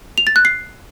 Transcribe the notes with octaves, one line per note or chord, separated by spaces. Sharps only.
F7
A6
F#6
C7